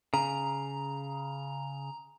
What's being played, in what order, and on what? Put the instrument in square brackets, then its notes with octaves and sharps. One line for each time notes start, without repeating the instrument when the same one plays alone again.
[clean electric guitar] C#3 [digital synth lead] A#5